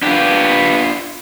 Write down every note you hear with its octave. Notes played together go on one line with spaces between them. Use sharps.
B3 D4 F4 G4